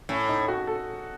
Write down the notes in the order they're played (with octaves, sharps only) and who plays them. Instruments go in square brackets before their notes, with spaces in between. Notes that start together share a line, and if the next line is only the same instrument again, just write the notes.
[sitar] A2 [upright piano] C#4
[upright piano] D#4
F#4
A4